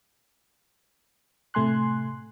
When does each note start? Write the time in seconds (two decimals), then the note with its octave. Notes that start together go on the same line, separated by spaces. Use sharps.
1.54 A2 C3 A3 G#5 C6 F#6